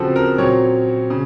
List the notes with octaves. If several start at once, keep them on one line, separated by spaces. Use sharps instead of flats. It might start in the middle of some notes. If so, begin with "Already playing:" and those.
Already playing: C#3 F3 C4 F#4 A4
A#4
A#2 F#3 C4 C#5
C#3